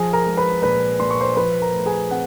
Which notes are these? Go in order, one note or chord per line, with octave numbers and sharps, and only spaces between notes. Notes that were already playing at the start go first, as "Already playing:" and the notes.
Already playing: F3 G#4 G#5
A#4 A#5
G#3
B4 B5
A#2 B4 B5
A#2 C6
C#6
C5 C6
F3 B4 B5
A#4 A#5
A3
G#4 G#5
C4 F#5